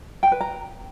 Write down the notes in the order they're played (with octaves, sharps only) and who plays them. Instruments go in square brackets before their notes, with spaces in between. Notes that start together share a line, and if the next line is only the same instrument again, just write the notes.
[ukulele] G5
B4
A#5